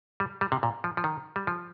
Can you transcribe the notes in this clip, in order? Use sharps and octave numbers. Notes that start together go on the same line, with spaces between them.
G3
G3
C3
A#2
F3
F3
D#3
G3
F3